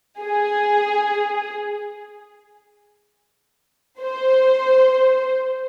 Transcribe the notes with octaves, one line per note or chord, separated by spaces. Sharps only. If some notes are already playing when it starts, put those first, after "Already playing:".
G#4
C5